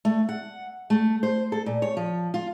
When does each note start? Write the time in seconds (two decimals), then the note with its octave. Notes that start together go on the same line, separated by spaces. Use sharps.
0.05 A3
0.29 F#5
0.90 A3
1.23 C5
1.52 A4
1.66 A#2
1.82 C#5
1.97 F3
2.34 F4